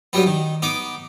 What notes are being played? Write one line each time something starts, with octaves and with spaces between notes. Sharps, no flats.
G2 F#3 G3 B3
D#3
B3 D#4 D6